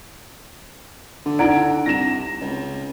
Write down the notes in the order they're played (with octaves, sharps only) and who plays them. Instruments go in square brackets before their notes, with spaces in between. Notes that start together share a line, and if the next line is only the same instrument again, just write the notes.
[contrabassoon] D3
[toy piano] D#4 E4 D5 [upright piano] F#5 A#5 D7
[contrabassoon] C2 [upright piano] A#6 E7
[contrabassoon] C#2